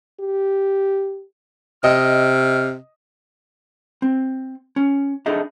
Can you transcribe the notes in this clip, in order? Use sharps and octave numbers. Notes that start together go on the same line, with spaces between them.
G4
C3 D#5 F6
C4
C#4
D4 D#4 G#4 A4 D#5 E5